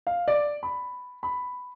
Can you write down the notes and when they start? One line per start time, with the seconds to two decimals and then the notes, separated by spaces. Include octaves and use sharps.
0.07 F5
0.28 D5
0.63 B5
1.23 B5